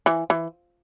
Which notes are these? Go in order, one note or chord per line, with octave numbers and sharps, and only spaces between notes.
E3
E3